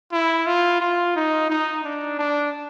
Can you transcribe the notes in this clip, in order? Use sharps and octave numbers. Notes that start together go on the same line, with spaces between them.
E4
F4
F4
D#4
D#4
D4
D4